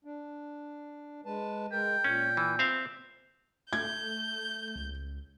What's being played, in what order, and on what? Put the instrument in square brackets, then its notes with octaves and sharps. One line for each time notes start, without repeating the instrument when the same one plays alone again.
[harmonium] D4
G#3 B4 A5
[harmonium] G#3 A#4 [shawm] G5
[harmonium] A#2 [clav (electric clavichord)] C#4
[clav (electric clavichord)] E3
C4 E5 F5
[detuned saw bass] A3 [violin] G6 [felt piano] G#6
[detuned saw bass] C#2